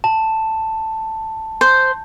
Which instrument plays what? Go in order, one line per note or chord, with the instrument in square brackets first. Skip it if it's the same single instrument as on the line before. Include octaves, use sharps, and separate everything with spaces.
[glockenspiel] A5
[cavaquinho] C5